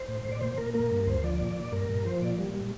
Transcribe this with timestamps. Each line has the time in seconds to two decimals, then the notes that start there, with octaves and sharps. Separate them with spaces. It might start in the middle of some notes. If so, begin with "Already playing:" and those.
Already playing: C5
0.08 A2
0.25 A2
0.32 D5
0.41 A#2 C5
0.58 A#2 A#4
0.74 A#3 A#4
0.91 G2
1.06 D2 C5
1.23 F3 D5
1.40 A#2
1.56 A#2
1.72 G2 A#4
1.89 G2
2.05 F3 C5
2.22 A#2 D5
2.38 G3
2.55 G3